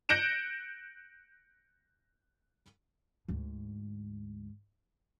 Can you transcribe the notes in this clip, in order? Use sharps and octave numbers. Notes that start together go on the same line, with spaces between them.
F#6 G6 A#6 C#7 D7 E7
D2 G#2